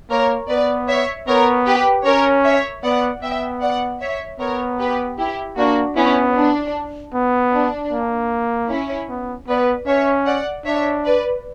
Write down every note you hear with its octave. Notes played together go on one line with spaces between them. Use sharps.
A#3 A#4 C#5
B3 B4 D5
C#5 E5
B3 A#4 C#5
G4 B4
C#4 A#4 C#5
C#5 E5
B3 D5 F#5
B3 E5 G5
D5 F#5
C#5 E5
B3 A#4 C#5
G4 B4
E4 G4
A#3 D4 F#4
B3 C#4 E4
D4
B3
D4
A#3
C#4 E4
B3
B3 B4 D5
C#4 C#5 E5
D5 F#5
D4 C#5 E5
B4 D5